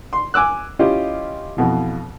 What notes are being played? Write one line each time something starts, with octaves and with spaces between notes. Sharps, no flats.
C6
G#5 D6 E6 F#6
C#4 E4 F4 G4 D#5
F2 B2 E3